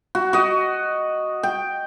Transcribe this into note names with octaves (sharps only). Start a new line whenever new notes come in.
F#4
F#4 D#5
G5